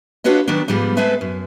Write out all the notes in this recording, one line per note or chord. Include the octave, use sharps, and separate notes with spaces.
D4 F4 F#4 B4 C#5 D#5
D#3 F#3 B3 D4
G#2 F3 G3 B3 F4
G#3 A3 C4 A4 B4 E5
F#2